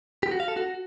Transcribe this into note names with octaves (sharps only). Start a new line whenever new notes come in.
G4
F#4
F5
A4
F#4